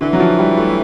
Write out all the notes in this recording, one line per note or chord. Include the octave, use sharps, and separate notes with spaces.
D3 E3
F#3
F3
G3
A3